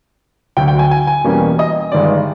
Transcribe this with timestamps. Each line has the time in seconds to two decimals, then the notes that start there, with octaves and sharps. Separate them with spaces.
0.57 D2 D3 F#3 G5
0.68 G5
0.79 G#5
0.91 G#5
1.07 G#5
1.24 E2 B2 G3 A#3 C#4
1.59 D#5
1.92 G1 G2 D#3 G#3 D5